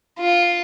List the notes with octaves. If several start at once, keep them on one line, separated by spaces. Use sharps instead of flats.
F4